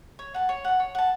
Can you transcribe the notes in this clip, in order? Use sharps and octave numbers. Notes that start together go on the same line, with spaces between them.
C#5
F#5 A5
C#5
F#5 A5
C#5
F#5 A5